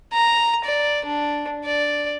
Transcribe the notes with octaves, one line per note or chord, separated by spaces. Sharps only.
A#5
D5
D4
D5